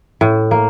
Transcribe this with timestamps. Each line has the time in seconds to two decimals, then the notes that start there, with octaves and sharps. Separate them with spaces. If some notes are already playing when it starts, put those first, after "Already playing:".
0.21 A2
0.51 A#3